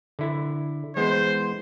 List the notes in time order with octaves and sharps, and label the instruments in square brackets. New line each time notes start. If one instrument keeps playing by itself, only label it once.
[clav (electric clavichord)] D3 E4
[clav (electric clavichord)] E3 G#3 B3 [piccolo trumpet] C5